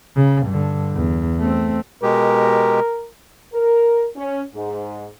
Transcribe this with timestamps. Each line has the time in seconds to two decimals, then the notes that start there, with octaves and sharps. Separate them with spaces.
0.16 C#3
0.47 G2 D3
0.94 E2
1.39 A3 C4
2.03 B2 G#3 G4 A#4
3.53 A#4
4.16 C#4
4.54 G#2